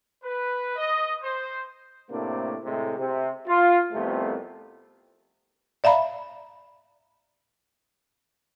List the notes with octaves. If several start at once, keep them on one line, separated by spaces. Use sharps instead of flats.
B4
D#5
C5
A2 C3 A3 A#3 D4 C5
A2 C3 G#3
C3
F4
C2 F2 C3 A3 B3 C4
D5 E5 F5 A#5 B5